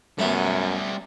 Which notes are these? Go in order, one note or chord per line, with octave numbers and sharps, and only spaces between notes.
F#2 G3 A3 B3 E5